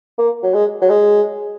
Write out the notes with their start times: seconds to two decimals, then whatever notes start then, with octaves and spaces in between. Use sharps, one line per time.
0.18 A#3
0.43 F#3
0.54 G#3
0.82 F#3
0.90 G#3